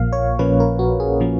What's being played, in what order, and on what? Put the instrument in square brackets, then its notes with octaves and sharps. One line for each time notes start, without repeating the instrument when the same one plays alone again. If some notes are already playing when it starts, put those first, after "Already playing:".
Already playing: [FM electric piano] A#1 A#2 F3 A#3 F5
C#5
A#1 A#2 F3 A#3 C#4 B4
A#4
F#4
G#4
A#2 F3 A#3 C#4